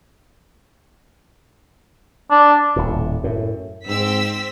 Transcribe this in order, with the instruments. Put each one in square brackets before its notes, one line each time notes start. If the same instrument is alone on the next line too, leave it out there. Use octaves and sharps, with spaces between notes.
[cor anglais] D4
[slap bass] D#1 A2
F#2 A2
[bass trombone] G#2 [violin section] C4 E6 B6